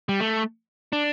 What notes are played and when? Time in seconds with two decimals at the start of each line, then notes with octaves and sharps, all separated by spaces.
0.09 G3
0.20 A3
0.93 D4